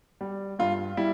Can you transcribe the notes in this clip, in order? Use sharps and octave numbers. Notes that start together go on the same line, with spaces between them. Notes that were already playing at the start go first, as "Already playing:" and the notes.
G3
G2 F4
G3 E4